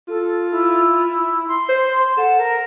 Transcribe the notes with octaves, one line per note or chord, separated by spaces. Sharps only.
F4 A4
E4
C6
C5
A4 F#5
A#4